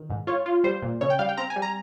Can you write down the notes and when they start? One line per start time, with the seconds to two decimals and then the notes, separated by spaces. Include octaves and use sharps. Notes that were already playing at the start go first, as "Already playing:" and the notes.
Already playing: D#3
0.10 G#2
0.27 F4 C#5
0.46 F4
0.64 G3 C5
0.82 A#2
1.01 C#3 C#5
1.10 G5
1.19 G3 F5
1.29 G5
1.37 C4 A#5
1.50 G#5
1.56 G3
1.62 A#5